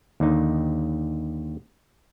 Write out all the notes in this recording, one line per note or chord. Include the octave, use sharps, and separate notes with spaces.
D#2 D3 D#4